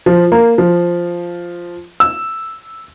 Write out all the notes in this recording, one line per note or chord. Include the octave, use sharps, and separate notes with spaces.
F3
A#3
F3
E6